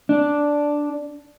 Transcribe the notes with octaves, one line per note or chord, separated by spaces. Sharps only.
D4